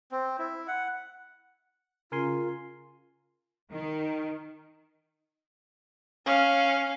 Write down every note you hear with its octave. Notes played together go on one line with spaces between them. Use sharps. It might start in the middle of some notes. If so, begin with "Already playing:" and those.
C4
E4
F#5
C#3 F4 A#4 G#5 C6
D#3
C#4 F5